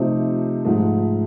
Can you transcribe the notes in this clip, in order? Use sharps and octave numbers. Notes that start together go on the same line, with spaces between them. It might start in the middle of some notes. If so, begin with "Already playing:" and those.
Already playing: C3 F3 A3 C4 D#4
G#2 F3 A3